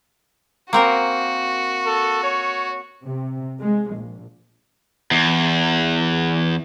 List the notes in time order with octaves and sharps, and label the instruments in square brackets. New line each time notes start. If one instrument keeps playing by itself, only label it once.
[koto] A#3 C4 A#4 [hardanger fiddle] F#4
[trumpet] A4
C#5
[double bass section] C3
G#3
A#1
[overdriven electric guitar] E2